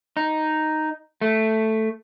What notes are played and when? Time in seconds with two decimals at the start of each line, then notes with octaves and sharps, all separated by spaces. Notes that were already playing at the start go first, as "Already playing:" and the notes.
0.17 D#4
1.21 A3